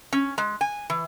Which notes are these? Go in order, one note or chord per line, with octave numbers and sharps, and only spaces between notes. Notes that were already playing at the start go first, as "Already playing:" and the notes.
C#4
G#3
G#5
E3